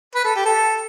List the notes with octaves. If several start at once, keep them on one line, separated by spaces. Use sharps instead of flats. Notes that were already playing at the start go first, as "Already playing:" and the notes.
B4
A4
G4
A4